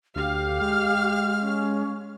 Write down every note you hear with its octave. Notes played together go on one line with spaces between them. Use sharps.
D2 G4 F5
G#3 F6
C#4